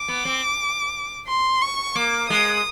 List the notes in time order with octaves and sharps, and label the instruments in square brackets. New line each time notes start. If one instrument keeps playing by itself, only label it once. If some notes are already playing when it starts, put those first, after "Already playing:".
Already playing: [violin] D6
[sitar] B3
C4
[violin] C6
C#6
[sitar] A#3 [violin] D6
[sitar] G#3 [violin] D#6